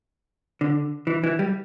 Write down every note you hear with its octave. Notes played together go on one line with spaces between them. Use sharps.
D3
E3
E3
G3